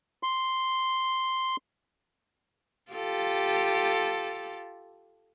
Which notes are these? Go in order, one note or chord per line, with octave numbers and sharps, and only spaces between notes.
C6
F4 G4 A4